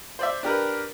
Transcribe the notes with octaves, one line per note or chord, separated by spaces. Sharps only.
C5 D5 E5
D4 G4 A#4 B4